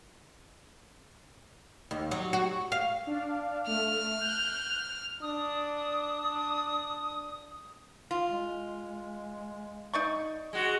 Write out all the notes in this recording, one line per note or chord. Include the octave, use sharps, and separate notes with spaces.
D#2
F#3
F#4
F5
D4 F5
A3 F6
F#6 G6
D4 D#6
F4
G#3
D#4 D5 C#6
G#3 F#4